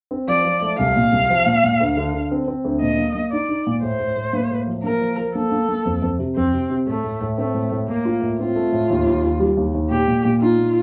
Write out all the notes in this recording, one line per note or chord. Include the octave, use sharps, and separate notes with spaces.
C4
F3 D5
F3
A3
C2 F5
A#2
C2
F3
A#2
A#2
D2
D3
D3
C4
C4
D2
A#2 D#5
A#3
A#3
D#4 D5
D#4
A#2
A2 C5
A2
A2
A#3
A2
F3
A#3 A#4
F3
F3
A#3 A4
A#3
A#3
F2
F2
C3
F2 C4
C3
C3
A2 A3
A2
A2
A3 C4
A2
A2
A2 A#3
F4
A2
C4 F4
A3
A2
D#2
D#2
D#2
G3
D#2
D#2
A#2 G4
A#2
A#2
D#4 F4
A#2